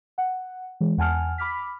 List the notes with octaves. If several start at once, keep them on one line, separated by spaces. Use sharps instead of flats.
F#5
E3 G#3
E2 F#5 G#5 A5 F6
B5 D6 F6 B6